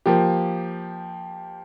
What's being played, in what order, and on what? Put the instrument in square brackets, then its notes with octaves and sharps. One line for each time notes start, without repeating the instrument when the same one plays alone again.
[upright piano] F3 A#3 G4